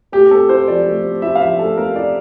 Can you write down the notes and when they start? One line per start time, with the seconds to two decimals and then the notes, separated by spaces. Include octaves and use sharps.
0.12 A3 G4
0.31 C4 A4
0.49 E4 C5
0.68 F3 D5
0.86 A3
1.04 C4
1.22 E4 E5
1.35 F5
1.40 F3 E5
1.59 A3 A4
1.77 C4 A#4
1.95 E4 D5